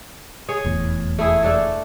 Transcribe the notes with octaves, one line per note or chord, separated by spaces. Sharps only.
G#4 C#5
F1 E2 A2
A3 E4 G#4
A3 D4 A4